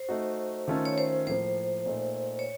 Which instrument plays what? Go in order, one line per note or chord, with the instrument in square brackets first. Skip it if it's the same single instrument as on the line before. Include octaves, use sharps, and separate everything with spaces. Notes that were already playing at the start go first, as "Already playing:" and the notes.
Already playing: [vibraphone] C5
[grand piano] A3 D#4 F#4
D#3 A3 C#4 F4 A4
[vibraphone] C#5
C5
[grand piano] A2 F3 A#3 [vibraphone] C5
[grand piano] A#2 A3 D#4
[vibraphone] C#5